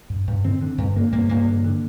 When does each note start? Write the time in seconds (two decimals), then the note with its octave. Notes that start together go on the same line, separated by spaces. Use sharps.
0.10 G2
0.27 G2
0.44 D3 C4
0.61 D3
0.78 G2
0.96 D3 A#3
1.12 G2 A#3
1.29 G2 A#3
1.47 D3
1.64 D3